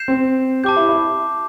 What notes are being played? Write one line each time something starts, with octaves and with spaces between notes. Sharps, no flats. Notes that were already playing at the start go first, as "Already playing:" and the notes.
Already playing: G6 C7 E7
C4
G4 A5 D6 G6
E4
E4